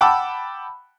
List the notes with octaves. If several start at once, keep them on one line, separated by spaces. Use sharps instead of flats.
F#5 G5 A5 B5 D6 E6